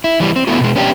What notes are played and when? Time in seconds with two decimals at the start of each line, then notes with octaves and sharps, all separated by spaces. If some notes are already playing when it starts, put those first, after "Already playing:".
0.04 E4
0.20 E3 G3
0.36 C4
0.47 A3 B3 E4 F#4
0.61 B2 G#3
0.76 B3 C#4 D4 G4